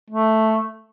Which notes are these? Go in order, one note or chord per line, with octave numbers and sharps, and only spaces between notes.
A3